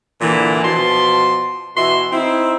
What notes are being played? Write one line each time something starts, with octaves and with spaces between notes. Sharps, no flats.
A#2 D3 E3
B2 F3 A5 C6
B2 E3 F#4 E5 C6
C4 D#4 E4